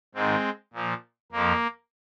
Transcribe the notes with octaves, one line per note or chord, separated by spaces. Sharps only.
G#2 D#3 G#3 C4
A#2 F3
F2 F3 A#3